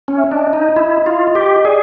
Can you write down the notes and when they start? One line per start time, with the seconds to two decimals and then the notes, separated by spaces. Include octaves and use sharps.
0.08 C#4
0.17 E5
0.31 D4 D#5
0.53 D#4
0.76 E4
1.06 F4
1.35 G4
1.65 G#4 D5